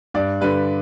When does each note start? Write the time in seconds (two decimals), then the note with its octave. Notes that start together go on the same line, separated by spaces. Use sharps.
0.14 G2 D5
0.41 D3 G3 B4